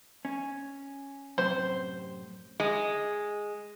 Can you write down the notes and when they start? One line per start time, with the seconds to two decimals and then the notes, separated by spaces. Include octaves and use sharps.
0.25 C#4
1.38 F#2 A2 C3 C5
2.60 G#3